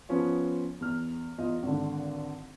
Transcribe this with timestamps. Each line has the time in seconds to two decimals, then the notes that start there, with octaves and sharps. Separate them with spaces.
0.09 F3 B3 C#4 F4
0.80 E2 F6
1.38 E2 F4 D#5
1.63 G#1 D3